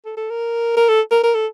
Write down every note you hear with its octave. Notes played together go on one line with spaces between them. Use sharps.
A4
A4
A#4
A#4
A4
A#4
A#4
A4